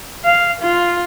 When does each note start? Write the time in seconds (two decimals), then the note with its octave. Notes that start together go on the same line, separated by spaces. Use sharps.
0.25 F5
0.62 F4